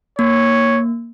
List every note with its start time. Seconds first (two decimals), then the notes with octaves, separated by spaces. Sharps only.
0.19 A#3 C#5